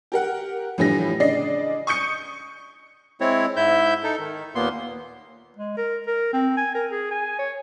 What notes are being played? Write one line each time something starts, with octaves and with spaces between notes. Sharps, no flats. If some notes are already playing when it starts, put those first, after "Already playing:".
G4 A#4 F#5
A2 D3 E3 F3 G3 A#6
C#3 D4 D5 D#5 A#6 C7
C#6 D#6 G6 C#7
G#3 C4 E4 C#5
G#2 E4 E5 G6
D#4 A4
D#3
D#2 A#2 A#3 B3 C6
G#3
A#4
A#4
C4
G#5
A#4
G#4
G#5
C#5